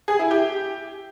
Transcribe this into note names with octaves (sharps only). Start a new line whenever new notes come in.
G#4
E4
G4